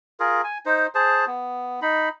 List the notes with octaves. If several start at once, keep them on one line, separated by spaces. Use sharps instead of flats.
F4 G#4 A#4
G#5
D#4 C5
G#4 C5 A5
B3
D#4 B5